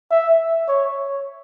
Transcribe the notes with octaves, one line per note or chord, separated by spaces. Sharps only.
E5
C#5